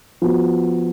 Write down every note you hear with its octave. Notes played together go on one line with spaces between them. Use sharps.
F3 B3 F#4